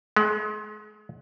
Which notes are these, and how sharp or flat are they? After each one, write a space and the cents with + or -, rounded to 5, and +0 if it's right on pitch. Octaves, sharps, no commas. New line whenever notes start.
G#3 +35